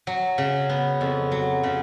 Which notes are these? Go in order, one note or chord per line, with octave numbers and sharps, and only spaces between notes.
F#3
C#3
B3
F2
F#3
C#3